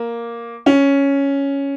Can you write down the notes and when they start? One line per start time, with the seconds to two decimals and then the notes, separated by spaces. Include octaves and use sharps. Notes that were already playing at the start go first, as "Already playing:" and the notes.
Already playing: A#3
0.66 C#4